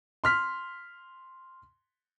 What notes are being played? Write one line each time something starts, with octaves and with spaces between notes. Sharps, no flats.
C6 F6 B6